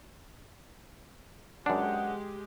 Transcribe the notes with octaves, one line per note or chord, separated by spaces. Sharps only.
F#2 G#3 D4 G4 G#4 B4 F#5